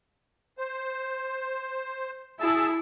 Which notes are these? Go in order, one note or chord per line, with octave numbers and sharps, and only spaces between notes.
C5
E4 G#4 A5 E6